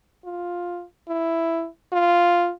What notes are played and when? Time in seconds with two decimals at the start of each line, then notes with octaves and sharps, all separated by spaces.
0.25 F4
1.08 E4
1.92 F4